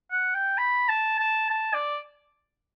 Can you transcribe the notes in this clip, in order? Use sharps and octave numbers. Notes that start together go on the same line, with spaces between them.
F#5
G5
B5
A5
A5
A5
D5